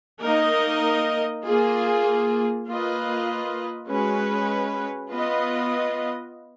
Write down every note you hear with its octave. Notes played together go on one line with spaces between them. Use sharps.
A#3 D#4 A#4 D#5
A#3 F4 G#4
A#3 F4 B4 D#5
G#3 C#4 F#4 B4
B3 F4 B4 D#5